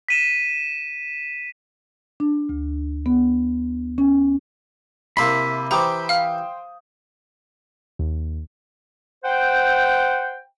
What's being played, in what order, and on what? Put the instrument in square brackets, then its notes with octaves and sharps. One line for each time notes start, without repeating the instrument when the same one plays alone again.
[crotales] B6 D#7 E7
[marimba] D4
D2
B3
C#4
[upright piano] C3 E4 [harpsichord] A#3 E5 C6 [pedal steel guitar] B5
[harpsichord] E3 G4 [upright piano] C5 G5 D#6 [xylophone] A#5 D6
[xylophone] F5 F6
[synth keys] D#2
[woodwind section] C5 F#5 G5